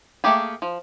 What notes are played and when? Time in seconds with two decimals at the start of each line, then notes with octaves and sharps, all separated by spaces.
0.24 A3 A#3 G4 G#4
0.62 F3